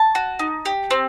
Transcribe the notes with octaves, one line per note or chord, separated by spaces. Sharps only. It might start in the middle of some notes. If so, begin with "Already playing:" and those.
Already playing: A5
F#4
D#4
G4
C4